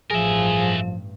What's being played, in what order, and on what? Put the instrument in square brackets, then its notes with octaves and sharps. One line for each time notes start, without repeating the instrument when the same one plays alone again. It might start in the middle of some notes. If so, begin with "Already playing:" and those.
[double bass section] A1 G2 [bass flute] F3 [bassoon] G#4 [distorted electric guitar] A#4 E5